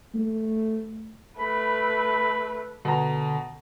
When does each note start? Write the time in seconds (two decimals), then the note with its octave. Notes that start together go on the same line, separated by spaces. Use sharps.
0.14 A3
1.39 A3 B4 B5
2.85 B2 D3 A#5